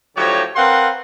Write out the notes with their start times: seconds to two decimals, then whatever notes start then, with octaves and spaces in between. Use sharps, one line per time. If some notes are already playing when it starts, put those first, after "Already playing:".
0.17 A2 D3 F3 F#3 G4 C#5
0.55 C4 A#4 B4 F5 F#5 C6